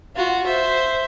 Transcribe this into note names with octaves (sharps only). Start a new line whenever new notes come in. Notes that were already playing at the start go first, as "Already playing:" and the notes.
F4 F#4
C5 E5